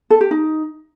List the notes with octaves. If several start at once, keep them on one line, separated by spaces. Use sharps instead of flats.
A4
G4
D#4